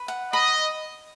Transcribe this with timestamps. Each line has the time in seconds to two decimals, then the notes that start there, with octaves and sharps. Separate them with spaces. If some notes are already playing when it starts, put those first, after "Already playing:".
Already playing: B4
0.08 F#5
0.33 D#5 B5